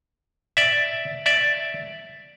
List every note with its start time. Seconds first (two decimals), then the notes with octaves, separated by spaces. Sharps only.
0.57 D5 E5
1.26 D5 E5